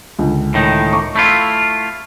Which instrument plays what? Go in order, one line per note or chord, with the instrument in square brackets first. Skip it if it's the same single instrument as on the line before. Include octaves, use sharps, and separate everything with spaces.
[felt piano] C#2 D3
[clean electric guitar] A2 D#3 D#4
[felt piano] C#6 D6
[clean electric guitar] A3 E4 F4